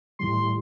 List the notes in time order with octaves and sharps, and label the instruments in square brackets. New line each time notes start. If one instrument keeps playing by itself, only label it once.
[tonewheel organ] A2 E3 G3 [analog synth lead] C6